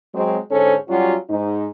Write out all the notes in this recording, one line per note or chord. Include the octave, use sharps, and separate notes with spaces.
F#3 G#3 C4
G#2 D3 C#4 G#4 A4 C5
F#3 G3 C#4 F4 F#4
G#2 D#4